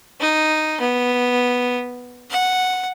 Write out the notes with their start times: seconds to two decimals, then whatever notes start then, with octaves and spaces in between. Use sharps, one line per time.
0.20 D#4
0.80 B3
2.30 F#5